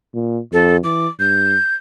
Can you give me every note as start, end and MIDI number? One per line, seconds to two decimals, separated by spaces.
0.14 0.40 46
0.53 0.79 41
0.53 0.77 69
0.84 1.07 52
0.84 1.08 86
1.20 1.56 43
1.20 1.75 91